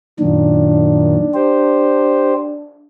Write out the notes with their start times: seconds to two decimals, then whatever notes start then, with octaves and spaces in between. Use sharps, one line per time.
0.20 F#2 A#2 D#3 D4
1.34 G4 C5